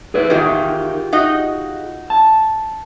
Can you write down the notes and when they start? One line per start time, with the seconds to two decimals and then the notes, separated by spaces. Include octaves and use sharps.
0.14 G#4 B4 D5
0.30 E2 D#3 F4 G4 G#4
1.13 D#4 F#4 D#5
2.10 A5